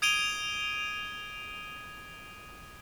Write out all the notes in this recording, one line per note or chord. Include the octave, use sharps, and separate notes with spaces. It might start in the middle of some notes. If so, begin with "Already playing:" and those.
D#6 G#6 D7 D#7 F7 G7